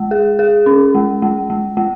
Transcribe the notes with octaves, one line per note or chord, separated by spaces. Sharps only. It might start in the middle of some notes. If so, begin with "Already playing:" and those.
Already playing: G#3
G#4
G#4
C#4
G#3
G#3
G#3
G#3